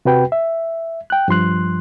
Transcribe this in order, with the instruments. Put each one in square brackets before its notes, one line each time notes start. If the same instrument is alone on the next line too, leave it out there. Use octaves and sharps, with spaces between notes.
[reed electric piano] C3 F#4 B4 G5
E5
G5 F#6
G2 F3 C6 F#6